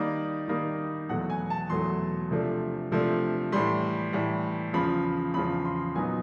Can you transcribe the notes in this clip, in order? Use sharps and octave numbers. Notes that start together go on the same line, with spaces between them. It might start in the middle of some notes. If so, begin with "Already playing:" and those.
Already playing: D#3 G3 A#3 D#4 D5
D#3 G3 A#3 D#4
E2 B2 F#3 A3 F#5
G#5
A5
E2 B2 F#3 A3 C6
C3 F3 A3 D4
C3 F3 A3 D4
A2 E3 G3 C6
A2 E3 G3
E2 C#3 F3 B5
E2 C#3 F3 B5
C6
A#2 F#3 B3 D#4 G#5